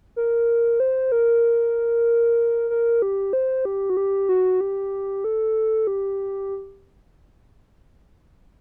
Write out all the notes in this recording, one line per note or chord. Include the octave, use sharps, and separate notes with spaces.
A#4
C5
A#4
A#4
G4
C5
G4
F#4
G4
F#4
G4
A4
G4